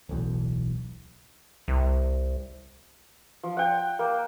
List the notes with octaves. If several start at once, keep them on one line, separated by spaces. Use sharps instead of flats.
D1 B1 E2
C2
F3
F#5 G5
A#3